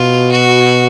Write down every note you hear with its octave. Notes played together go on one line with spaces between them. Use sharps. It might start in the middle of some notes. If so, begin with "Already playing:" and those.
Already playing: B2 F4
F#4